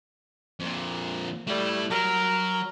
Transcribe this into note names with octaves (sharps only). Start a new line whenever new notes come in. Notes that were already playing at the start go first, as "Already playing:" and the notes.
F2 A#2
G3 A3 E4
F#3 A#4